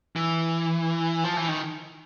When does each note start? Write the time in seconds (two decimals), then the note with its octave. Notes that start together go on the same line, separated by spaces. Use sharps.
0.16 E3
1.24 F3
1.37 E3
1.48 D#3